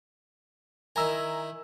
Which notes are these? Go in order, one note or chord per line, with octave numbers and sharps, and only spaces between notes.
D#3 E4 A#4 G#5 A#5 E6